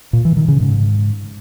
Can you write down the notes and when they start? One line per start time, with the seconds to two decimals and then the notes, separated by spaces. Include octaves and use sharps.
0.13 A#2
0.25 E3
0.37 D#3
0.48 C#3
0.60 G#2